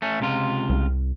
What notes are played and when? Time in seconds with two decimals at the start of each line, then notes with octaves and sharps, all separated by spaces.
0.02 A3 C#4
0.20 C#2 C3 F4
0.69 C2